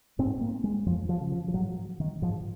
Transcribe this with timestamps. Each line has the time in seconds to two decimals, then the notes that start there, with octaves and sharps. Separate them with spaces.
0.19 G#2 C4
0.41 A#3
0.64 G#3
0.86 F2 F3
1.09 F3
1.20 C#3
1.32 F3
1.48 F3
1.54 G#2 F#3
2.00 D#3
2.22 G#2 F3